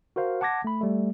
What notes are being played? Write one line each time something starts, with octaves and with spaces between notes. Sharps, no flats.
F#4 A#4 C5 F5
F#5 A5 D6 G#6 A#6
A3 B5
G3 A3